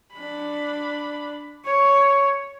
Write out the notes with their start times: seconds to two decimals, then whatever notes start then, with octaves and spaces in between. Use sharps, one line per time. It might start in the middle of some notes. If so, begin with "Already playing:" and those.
0.14 D4 B5
1.66 C#5